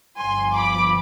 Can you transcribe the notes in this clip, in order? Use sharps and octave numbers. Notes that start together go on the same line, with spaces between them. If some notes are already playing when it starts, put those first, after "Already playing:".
G1 G2 F3 G#5 C6
B5 D6